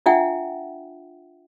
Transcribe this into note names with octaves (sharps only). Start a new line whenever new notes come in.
D4 F4 E5 F#5 G5